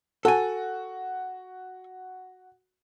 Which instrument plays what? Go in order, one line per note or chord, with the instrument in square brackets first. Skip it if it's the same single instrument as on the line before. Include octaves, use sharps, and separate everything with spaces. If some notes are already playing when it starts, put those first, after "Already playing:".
[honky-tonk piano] F#4 [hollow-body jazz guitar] A4 G#5